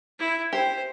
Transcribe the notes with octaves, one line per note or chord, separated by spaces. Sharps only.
E4
G4 C5